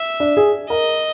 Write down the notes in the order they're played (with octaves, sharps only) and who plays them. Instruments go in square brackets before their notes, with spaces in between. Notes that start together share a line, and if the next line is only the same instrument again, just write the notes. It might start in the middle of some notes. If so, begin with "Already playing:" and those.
Already playing: [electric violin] E5
[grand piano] D4
G#4
[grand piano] A#4 [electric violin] D#5